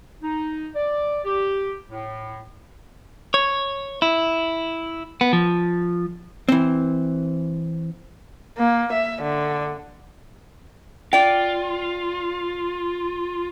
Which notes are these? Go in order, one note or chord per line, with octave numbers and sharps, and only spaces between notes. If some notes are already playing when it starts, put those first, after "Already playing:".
D#4
D5
G4
A2
C#5
E4
B3
F3
E3 C4
A#3
E5
D3
F4 D5 G5